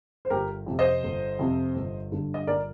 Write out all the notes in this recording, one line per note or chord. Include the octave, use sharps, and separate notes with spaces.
C5
G1 G4 A#4
F2 C3
C5 D#5
G1
F2 C3
G1
G2 D3
D#5
G1 A#4 D5